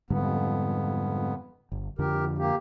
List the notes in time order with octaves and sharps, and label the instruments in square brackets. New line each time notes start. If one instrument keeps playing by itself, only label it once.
[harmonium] F2 B3 [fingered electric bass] G#2 D3 G3
[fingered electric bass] G1
[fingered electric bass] F2 D3 F3 [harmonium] G4 A#4
[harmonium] A#3 G4